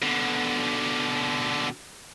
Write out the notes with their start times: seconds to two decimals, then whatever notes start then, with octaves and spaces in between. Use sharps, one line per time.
0.02 B2 D3